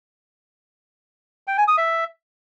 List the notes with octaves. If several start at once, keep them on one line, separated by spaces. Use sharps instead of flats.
G5
G#5
D#6
E5